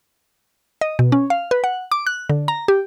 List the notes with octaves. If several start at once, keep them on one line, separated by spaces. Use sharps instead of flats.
D#5
B2
C#4
F5
B4
F#5
D6
F#6
D3
A#5
G4